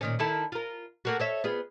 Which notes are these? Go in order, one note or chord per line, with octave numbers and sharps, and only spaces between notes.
A#2 D#3 C#4
D#3 E4 A4
F4 A#4
A3 A#3 F#4
A4 C#5 E5
B3 F4 G#4